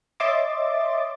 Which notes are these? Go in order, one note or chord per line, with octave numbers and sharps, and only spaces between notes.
C#5 D#5 E5 C6 D6 A6